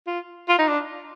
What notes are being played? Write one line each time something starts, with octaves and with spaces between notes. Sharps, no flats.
F4
F4
D#4
D4